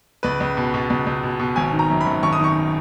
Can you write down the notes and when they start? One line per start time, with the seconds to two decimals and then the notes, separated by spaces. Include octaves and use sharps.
0.23 C#2 B4
0.40 C#2
0.57 B2
0.74 B2
0.90 C#2
1.07 C#2
1.23 B2
1.40 B2
1.56 G#1 G#5
1.73 D#3
1.79 A#5
1.90 F#2
2.01 B5
2.06 G#1
2.23 G#1 C#6
2.33 D#6
2.40 D#3 C#6